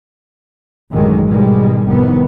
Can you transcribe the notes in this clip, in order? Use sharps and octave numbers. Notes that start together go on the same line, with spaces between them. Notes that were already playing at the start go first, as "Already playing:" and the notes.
A1 F#2 D3 D#3 F#3 G#3
G#2 B2 D#3 G3 G#3
F1 A2 C3 D#3 B3